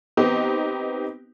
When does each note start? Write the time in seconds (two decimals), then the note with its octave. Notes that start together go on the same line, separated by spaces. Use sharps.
0.17 B3 C4 D#4 G4